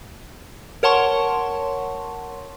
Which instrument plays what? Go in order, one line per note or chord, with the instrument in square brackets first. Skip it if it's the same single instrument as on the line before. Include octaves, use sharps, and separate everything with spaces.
[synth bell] A#4 C#5 F#5 A5 C6 C#6